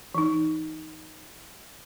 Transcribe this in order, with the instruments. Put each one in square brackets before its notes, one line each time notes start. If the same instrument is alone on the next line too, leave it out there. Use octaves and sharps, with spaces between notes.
[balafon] E3 D#4